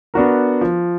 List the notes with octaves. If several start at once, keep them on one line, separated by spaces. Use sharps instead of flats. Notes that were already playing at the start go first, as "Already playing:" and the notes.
B3 D4 F#4 A#4
F3